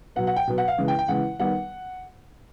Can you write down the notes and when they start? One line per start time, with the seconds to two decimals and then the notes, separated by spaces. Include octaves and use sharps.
0.16 B2 F#3 B3 F#5
0.27 F#5
0.36 G5
0.47 B2 F#3 B3
0.58 F#5
0.68 F5
0.78 C#3 E3 G#3
0.88 G5
0.99 G5
1.08 C#3 E3 G#3 F#5
1.39 D#3 G3 B3 F#5